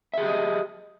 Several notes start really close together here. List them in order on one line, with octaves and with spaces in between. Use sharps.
E5 G#4 G4 D#5